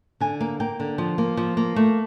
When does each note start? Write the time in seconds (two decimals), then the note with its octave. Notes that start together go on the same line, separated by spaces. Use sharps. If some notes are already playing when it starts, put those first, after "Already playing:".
0.20 D3 G#5
0.41 A#3
0.60 A#3 G5
0.80 D3
0.98 F3
1.18 A#3
1.37 F3
1.57 A#3
1.76 A3